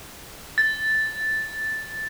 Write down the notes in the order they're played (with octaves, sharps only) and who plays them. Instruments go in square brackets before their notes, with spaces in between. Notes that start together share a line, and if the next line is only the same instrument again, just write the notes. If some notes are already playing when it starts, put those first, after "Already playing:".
[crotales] A6